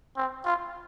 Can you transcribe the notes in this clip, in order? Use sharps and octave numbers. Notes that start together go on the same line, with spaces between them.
C4
F4